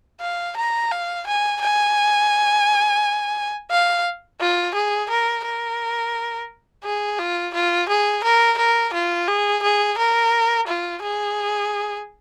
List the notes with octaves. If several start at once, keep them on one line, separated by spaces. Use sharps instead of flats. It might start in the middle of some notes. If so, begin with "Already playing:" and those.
F5
A#5
F5
G#5
G#5
F5
F4
G#4
A#4
A#4
G#4
F4
F4
G#4
A#4
A#4
F4
G#4
G#4
A#4
F4
G#4